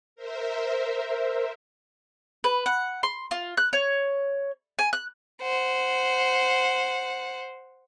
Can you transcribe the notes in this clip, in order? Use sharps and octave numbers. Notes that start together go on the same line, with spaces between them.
A#4 C5 E5
B4
F#5
C6
F4
F#6
C#5
G#5
F#6
C5 F#5